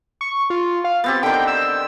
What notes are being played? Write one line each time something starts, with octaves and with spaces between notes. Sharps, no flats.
C#6
F4
F5
B3 C4 G4 A6
D3 D#3 G5
E6